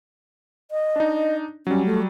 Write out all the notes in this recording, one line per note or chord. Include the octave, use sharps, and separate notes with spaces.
D#5
D4 D#4
F#3 G3 C#4
A3